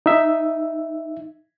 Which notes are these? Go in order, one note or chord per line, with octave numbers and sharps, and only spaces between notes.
D#4 E5